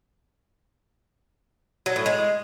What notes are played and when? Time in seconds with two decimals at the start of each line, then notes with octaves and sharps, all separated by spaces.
1.86 F#3
1.96 A2
2.06 G#3